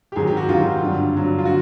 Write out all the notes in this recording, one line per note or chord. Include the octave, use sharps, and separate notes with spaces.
G4
G#2 D#3 F#3 G#4
G4
F#4
G#2 D#3 F#3 F4
G2 D3 F#3
G2 D3 F#3
F4
D3 F#4